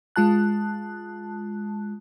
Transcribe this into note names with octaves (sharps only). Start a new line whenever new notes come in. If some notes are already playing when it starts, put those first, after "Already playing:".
G#3 F4 A5 F#6